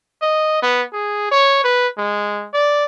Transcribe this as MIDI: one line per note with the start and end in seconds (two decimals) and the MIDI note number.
0.22 0.58 75
0.63 0.83 59
0.93 1.29 68
1.31 1.60 73
1.64 1.88 71
1.98 2.47 56
2.54 2.85 74